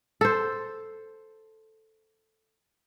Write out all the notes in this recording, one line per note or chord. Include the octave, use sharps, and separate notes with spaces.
A4 C5